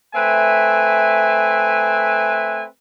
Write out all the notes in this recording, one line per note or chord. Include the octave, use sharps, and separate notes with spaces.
A3 C4 B4 E5 G#5